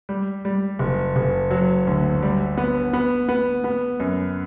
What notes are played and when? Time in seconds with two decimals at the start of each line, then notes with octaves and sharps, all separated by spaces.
0.09 G3
0.45 G3
0.79 F#1
1.16 F#1
1.51 F#3
1.87 D2
2.22 G3
2.58 B3
2.93 B3
3.29 B3
3.64 B3
4.00 F#2